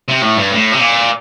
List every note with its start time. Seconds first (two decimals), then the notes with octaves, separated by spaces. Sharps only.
0.09 C3
0.22 A2
0.37 G2
0.53 A2
0.73 C3
0.81 A#2